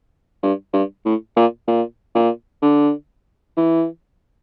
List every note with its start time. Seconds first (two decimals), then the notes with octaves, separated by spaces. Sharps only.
0.43 G2
0.73 G2
1.05 A2
1.36 A#2
1.68 A#2
2.15 A#2
2.62 D3
3.57 E3